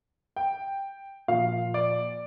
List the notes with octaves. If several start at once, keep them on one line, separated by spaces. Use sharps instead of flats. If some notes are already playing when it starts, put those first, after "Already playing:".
G5
A#2 F3 F5
D5